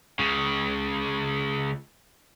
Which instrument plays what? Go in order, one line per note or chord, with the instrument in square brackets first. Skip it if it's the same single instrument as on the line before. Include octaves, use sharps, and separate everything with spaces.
[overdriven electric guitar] C#2 C#3